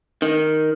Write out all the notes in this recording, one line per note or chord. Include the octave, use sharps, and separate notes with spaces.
D#3